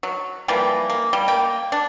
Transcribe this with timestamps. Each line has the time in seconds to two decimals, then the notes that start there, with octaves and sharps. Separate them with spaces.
0.03 F#3
0.48 E3 F3 G3 A#3
0.90 A#3
1.13 G3
1.28 A#3 G5
1.72 D4